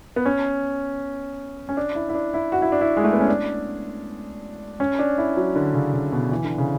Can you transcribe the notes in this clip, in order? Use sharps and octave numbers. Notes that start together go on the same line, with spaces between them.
B3
C#4
C#4
D4
E4
E4
D4
E4
F#4
E4
D4
E4
G#3
A3
B3
C#4
D4
C#4
D4
E4
F#3
D3
C#3
C#3
B2
E3
D3
C#3